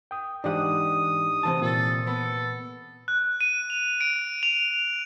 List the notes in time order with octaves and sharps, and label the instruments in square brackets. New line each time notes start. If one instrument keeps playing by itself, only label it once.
[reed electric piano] G5 D#6
[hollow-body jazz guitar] G#2 E3 F#5 [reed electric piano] D4 D#4 G4 [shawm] D#6
[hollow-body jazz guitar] C3 E3 A5
[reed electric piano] A#2 [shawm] A4
[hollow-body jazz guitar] B3 [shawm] A4
[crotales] F#6
D#7
F7
D7
F7